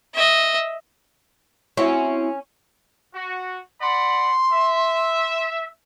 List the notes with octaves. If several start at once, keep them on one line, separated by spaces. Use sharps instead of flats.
D#5 E5
C4 C#4 E4 F#4
F#4
D5 F#5 B5 C6
E5